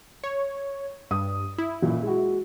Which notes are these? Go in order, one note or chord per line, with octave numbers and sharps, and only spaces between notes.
C#5
G2 D#6
E4
A1 A#2
G#3 F#4